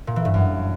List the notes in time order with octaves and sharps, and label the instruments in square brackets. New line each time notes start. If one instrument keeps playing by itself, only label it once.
[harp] A#2
E3
G2
F#2